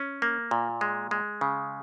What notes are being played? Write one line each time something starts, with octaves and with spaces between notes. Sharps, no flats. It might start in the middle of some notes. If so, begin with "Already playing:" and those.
Already playing: C#4
A#3
A#2
G#3
G#3
C#3